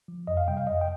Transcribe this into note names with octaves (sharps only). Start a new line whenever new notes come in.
F3
F2 D#5
F5
C3 G3 G5
F5
F2 D#5
G5